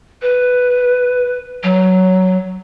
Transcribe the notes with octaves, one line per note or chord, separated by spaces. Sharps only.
B4
F#3